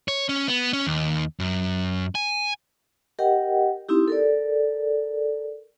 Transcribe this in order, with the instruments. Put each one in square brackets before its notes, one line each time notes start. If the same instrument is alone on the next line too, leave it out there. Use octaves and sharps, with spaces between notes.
[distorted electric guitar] C#5
C#4
B3
C#4
D#2
F#2
G#5
[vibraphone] G4 A#4 D#5 F#5 G5
C4 D#4 E4 G4
A4 A#4 D5